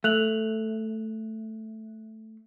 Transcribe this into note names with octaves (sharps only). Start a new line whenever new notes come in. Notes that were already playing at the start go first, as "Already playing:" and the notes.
A3 F#6 F7 F#7